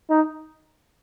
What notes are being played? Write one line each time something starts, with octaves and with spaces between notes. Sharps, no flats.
D#4